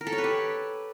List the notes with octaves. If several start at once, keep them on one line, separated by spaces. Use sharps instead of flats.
A#4
A4
C#5
B4
G4